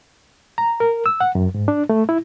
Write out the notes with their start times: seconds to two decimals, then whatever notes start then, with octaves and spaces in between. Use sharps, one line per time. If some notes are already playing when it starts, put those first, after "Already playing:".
0.58 A#5
0.80 A#4
1.06 E6
1.20 F#5
1.35 F#2
1.55 G#2
1.68 D4
1.90 A3
2.09 E4